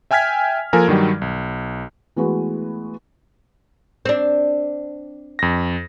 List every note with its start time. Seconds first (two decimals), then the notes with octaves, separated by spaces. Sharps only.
0.11 E5 G5 G#5 F6 G#6 B6
0.73 F3 A#3 A4 A#4 G#5
0.88 G2 D#3 F#3 G3
1.21 B1
2.16 E3 G#3 A3 B3 F#4 B4
4.05 C4 D4
5.39 F2 A#6